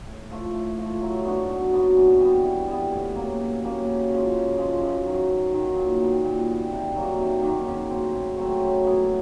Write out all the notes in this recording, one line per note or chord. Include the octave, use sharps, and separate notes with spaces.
A2
F3 A3
A2
F3 A3
F#3
B3 D4 F#4
F#3
B3 D4 F#4
E3
G3 B3
E3
G3 B3
A2
F#3 A#3 C#4
A2
F#3 A#3 C#4
C#3
F3 G#3 C#4
C#3
F3 G#3 C#4
F#2
D#3 F#3
F#2
D#3 F#3
A#2
G3 B3
A#2
B3
G3
C3
D#3 F#3 A#3
C3
D#3 F#3 A#3
C#3
F#3 A3 C4
C#3
F#3 A3 C4
C#3
F#3 B3 E4